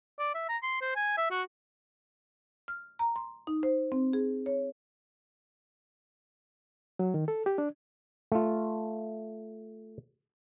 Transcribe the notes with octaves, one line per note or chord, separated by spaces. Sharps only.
D5
E5
A#5
C6
C5
G#5
E5
F#4
F6
A#5
C6
D#4
C5
C4
G#4
C#5
F#3
D#3
A4
G4
D4
A3 F4